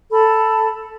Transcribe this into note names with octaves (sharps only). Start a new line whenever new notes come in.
A4 A5 B5